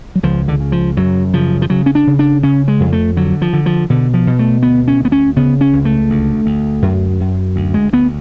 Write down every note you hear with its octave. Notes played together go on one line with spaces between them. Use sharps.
F#3
C#2 F3
D3
C#3
F3
F#2 F#3
C#3 F3
F3
C#3 F#3
C#4
D4
C#3
D4
C#3 C#4
G#3
F2
A3
D3 F#3
F3
D3
F3
B2 D3
F3
B2
A3
D2 B3
C#4
D2
B3
C#4
C#3 B3
C#4
C#2
A3
D2
D2
F#2
F#2
D2
G#3
D2 B3